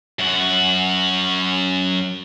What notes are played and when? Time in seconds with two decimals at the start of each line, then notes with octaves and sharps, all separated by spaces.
0.19 F#2 F#4